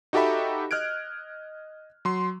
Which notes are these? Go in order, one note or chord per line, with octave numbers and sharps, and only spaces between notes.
D#4 F#4 G4 A4 E5 B5
D#5 F6 F#6 G#6 D7
F#3 C6